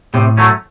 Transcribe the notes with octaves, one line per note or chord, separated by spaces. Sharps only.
A2 C3
F#3 A3 C#4